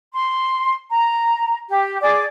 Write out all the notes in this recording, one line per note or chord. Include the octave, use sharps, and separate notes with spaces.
C6
A#5
G4
G#4 D5 D6